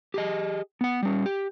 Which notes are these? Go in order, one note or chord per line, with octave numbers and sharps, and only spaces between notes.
G4 G#4 D#5
B3 F#5
G3 C#4
G4